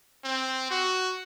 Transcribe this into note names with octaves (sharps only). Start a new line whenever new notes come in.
C4
F#4